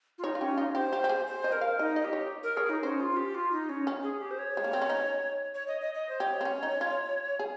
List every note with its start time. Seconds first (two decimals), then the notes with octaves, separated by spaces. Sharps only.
0.18 F4
0.24 D#4 C#5
0.35 F4
0.41 C#4 G4
0.57 D#4 F4
0.75 G4 C5
0.93 G4
1.04 G4
1.09 G#4
1.27 C5
1.44 D#5
1.52 A#4
1.61 F5
1.79 D#4 D#5
1.96 D#5
2.05 G4
2.13 C#5
2.43 A#4
2.57 G#4 C#5
2.69 D#4
2.83 C#4 C5
3.00 F4
3.17 G4
3.35 F4
3.52 D#4
3.69 C#4
3.87 C#4
4.03 G#4
4.21 G4
4.31 C5
4.39 C#5
4.57 G#3
4.64 A#3
4.73 C4
4.82 C#4
4.90 D#4
5.54 C#5
5.68 D#5
5.81 D#5
5.94 D#5
6.09 C5
6.20 G4 C#5
6.41 C4
6.45 C#4
6.63 D#4
6.81 F4
7.39 G#4